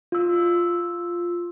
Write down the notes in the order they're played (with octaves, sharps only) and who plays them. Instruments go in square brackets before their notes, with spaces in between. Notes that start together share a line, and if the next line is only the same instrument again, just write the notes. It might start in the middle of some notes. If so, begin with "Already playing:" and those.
[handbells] F4 E6